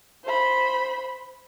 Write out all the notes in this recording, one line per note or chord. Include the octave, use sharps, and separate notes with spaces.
C5 B5